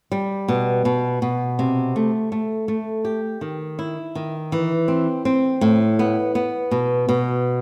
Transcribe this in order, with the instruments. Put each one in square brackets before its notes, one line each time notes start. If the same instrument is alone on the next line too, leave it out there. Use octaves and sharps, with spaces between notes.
[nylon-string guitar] G3
B2
B2
B2
C3
A3
A3
A3
G4
D#3
E4
D#3
E3
C4
C4
A2
B3
B3
B2
B2